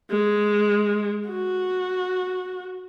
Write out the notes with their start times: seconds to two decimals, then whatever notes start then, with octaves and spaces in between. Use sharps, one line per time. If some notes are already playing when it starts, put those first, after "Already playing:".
0.11 G#3
1.29 F#4